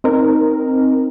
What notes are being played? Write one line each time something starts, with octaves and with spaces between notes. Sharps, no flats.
C4 D#4 A#4